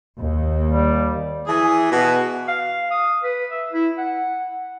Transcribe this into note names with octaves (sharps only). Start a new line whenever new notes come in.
D#2
G3
E3 G#4
B2 E3 F#4
F5
D#6
B4
E5
E4
F#5